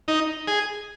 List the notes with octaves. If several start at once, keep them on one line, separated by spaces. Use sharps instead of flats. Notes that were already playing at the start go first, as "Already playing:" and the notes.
D#4
G#4